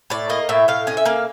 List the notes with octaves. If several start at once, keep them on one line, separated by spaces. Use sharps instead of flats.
A2 D5
A#3 D#5
A2 E5
A2 F5
C#4 D#5
E5
A#3 F5